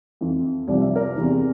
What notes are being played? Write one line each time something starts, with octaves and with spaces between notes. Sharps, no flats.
F2 E3
C2 C3 F3 D5
E5
A#4 D5
E2 C3 E3